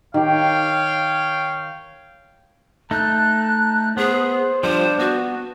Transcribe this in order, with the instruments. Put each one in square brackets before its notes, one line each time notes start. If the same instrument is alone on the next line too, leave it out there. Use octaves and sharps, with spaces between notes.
[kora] D#3 G4 [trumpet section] C#5 F5 G5
[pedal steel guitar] A3 D#4 [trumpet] A5 [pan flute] F#6
[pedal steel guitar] B3 [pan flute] G#4 [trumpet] C5
[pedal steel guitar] F3 G3 F4 [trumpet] D4 [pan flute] C5
[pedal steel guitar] B3 [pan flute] F#4